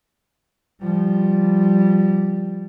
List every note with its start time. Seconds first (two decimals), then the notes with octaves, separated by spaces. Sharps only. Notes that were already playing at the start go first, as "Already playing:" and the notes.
0.82 F3 G3